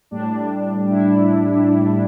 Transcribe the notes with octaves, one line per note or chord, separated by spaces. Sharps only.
A2 G3 D4
E4